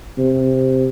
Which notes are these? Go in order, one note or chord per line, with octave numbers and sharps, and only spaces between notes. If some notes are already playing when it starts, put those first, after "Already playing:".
C3